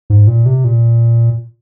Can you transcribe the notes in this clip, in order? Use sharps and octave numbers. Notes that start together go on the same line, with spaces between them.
G#2
A#2
C3
A#2